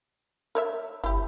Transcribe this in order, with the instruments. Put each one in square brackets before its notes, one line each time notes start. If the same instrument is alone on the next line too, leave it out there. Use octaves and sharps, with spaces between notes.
[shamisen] A#4 C#5 E5
[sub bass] G1 [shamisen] E4 G4